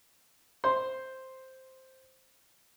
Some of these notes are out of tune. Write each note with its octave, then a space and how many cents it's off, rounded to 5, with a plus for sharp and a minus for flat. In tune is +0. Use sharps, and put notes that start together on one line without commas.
C5 +0 C6 +0